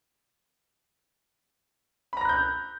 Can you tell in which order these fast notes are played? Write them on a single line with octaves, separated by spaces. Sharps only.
B5 A#5 A#6 F#6 G6